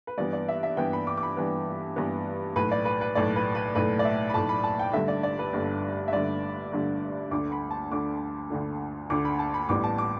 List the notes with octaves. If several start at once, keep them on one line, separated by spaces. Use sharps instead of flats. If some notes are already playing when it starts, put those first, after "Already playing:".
B4
G2 E3 B3 D5
D5
E5
E5
G2 E3 B3 G5
B5
D6
D6
B5
G2 E3 B3
G2 E3 B3
B1 A2 A3 B4
D5
B4
B4
B1 A2 A3 D5
B4
B4
B1 A2 A3 B4
D5
E5
B5
B1 A2 A3 A5
B5
A5
G5
G1 G2 D3 A3 E5
D5
D5
B4
G1 G2 D3 A3
E5
G1 G2 D3 A3 D5
G1 G2 D3 A3
D2 D3 A3 D6
B5
A5
D2 D3 A3 D6
D2 D3 A3
D2 D3 A3 D6
B5
A5
B5
A1 A2 G3 B3 D6
A5
D6